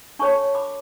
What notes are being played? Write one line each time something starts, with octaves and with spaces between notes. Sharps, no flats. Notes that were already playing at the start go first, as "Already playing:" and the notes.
D4 A4 C#5 A5 C#6
B5 D6